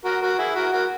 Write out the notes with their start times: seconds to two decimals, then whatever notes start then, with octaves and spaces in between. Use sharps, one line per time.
0.05 F#4 A#4
0.22 F#4 A#4
0.39 E4 G#4
0.56 F#4 A#4
0.73 F#4 A#4